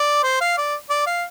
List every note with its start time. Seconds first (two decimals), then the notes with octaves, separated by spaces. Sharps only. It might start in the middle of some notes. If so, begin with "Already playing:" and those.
Already playing: D5
0.23 C5
0.41 F5
0.58 D5
0.90 D5
1.07 F5